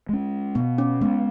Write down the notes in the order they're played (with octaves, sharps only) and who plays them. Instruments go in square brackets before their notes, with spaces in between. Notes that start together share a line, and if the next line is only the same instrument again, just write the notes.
[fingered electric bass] G#3 C#4
[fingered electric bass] B2 [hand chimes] B3
[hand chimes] C#4
[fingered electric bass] G#3 C#4 [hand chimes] B3